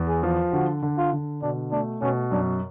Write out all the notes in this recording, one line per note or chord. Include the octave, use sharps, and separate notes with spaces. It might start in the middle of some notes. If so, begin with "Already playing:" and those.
Already playing: E2
G#4
F3
D3 F#4
D3
F4
D3
B2 D4
A3 D4
B2 C#4
F#2 D4